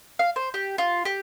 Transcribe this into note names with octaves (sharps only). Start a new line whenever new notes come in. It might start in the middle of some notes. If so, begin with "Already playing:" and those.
F5
C5
G4
F4
G4